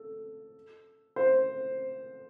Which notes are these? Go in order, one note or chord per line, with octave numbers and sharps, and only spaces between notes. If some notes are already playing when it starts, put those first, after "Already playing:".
Already playing: A4
C5